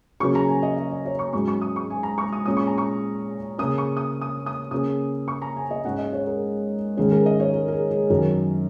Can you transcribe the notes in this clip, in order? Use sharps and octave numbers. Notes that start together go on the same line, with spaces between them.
C#3 F#3 A#3 C#4 C#6
A#5
G#5
D#5
D#5
D#5
C#5
C#6
G#2 F#3 C#4 C#6
C#6
D#6
C#6
G#5
A#5
C#6
D#6
A#2 G#3 C#4 D#6
C#6
A#5
C#6
C#3 A#3 C#4 D#6
C#6
D#6
D#6
D#6
C#3 A#3 C#4 D#6
C#6
A#5
G#5
D#5
G#2 G#3 C#4 F#5
D#5
C#5
A#4
G#2 D#3 G#3 C#4 G#4
A#4
D#5
C#5
A#4
A#4
G#4
G#4
F#2 D#3 F#3 C#4 A#4